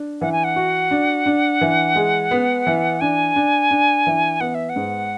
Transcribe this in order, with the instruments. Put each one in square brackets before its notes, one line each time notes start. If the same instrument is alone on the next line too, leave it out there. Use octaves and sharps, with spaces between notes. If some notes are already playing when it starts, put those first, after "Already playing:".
Already playing: [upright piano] D4
[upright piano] E3 [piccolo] F#5
[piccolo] G#5
F#5
[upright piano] F#4
D4
D4
E3
G#3
B3
E3
[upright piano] D4 [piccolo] G#5
[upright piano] D4
D4
E3
[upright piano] B3 [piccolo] F#5
[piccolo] E5
F#5
[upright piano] G#2